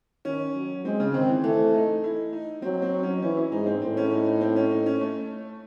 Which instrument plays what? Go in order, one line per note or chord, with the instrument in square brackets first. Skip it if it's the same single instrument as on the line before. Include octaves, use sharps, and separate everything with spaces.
[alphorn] D#3 [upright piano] C#4
[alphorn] F#3
[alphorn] G#3 [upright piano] C4
[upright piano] C#3
[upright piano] D#3 [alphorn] C4
[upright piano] E3
[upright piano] E3 [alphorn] A3
[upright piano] D#4
E4
D#4
[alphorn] F#3 [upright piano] C4
[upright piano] C4
C#4
D#4
[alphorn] E3 [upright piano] C#4
[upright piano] E4
[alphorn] G#2 [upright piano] D#4
[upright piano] C4
[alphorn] A2 [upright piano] C4
[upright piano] C#4
D#4
D#4
C4
C#4
D#4
C#4
A3